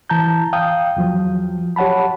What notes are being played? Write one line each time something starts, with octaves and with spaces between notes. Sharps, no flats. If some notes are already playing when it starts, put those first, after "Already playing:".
E3 A5 A#5 G6
F5 G5 D#6 G6
E2 F3 F#3
G4 C#5 F#5 A5 B5